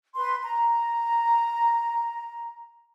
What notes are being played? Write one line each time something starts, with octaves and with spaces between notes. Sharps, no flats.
B4 C6
A#5